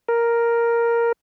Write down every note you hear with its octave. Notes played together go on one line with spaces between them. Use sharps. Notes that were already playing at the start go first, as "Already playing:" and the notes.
A#4